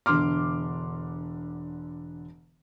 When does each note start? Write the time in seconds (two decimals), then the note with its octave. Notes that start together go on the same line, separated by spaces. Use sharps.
0.06 E1 D3 C6 D6 F6